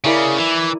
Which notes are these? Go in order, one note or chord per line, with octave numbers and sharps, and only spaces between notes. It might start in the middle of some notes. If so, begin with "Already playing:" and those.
C#3 E4 A#4 D5
E3